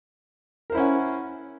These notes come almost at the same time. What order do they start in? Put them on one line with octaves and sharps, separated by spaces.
A#4 C5 E4 C#4 F#5